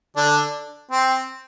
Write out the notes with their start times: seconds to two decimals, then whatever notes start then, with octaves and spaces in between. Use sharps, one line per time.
0.16 D3 D4
0.91 C4